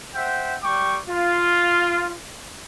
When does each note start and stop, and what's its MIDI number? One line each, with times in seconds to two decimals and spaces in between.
0.15 0.56 72
0.15 0.56 76
0.15 0.56 78
0.15 0.56 79
0.63 1.00 55
0.63 1.00 79
0.63 1.00 85
0.63 1.00 86
1.09 2.16 65